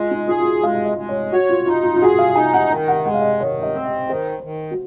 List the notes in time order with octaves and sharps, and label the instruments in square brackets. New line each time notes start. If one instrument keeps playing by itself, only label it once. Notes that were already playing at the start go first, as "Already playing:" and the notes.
Already playing: [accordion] G#3 [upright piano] F4
[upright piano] D#4
[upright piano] F4 [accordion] G#4
[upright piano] F4
F#4
[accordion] G#3 [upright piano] F5
[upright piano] F5
D#5
[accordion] G#3
[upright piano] C#5
[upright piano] F#4 [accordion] C#5
[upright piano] F4
[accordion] D#4 [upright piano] F4
[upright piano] F4
F4
[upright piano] F#4 [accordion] G#4
[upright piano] F5
[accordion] D#4 [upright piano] G#5
[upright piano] G#5
F#5
[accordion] D#3
[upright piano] F#5
[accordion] G#3 [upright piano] F#5
[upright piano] F5
D#5
[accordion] D#3 [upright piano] C#5
[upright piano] D#5
[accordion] C4
[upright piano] D#5
[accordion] D#3 [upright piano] C5
[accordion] D#3
[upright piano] F#4